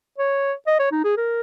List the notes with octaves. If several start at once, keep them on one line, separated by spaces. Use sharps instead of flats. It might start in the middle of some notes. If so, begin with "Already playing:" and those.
C#5
D#5
C#5
D#4
G#4
A#4